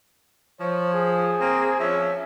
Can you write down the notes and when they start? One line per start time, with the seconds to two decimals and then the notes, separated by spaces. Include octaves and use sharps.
0.60 F3 C#5
0.94 G#4
1.39 A#3 C4
1.80 F3 C#4 E5